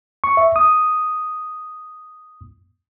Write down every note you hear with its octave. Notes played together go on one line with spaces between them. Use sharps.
C#6
E5
D#6